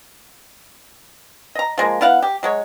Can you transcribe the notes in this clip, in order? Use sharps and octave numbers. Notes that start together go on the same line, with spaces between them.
D#5 A#5
F3 G#3 A#3
B3 E4 F5 F#5
G4
F#3 G#3 C#5